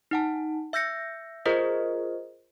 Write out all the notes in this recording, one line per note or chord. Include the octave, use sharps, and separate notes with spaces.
D#4 F#5 A5
E5 E6 G6 A#6 C#7
F4 G#4 A#4 C5 D#5